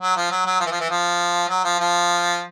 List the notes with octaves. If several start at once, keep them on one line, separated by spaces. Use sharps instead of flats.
F#3
F3
F#3
F#3
F3
E3
F3
E3
F3
F#3
F3
F3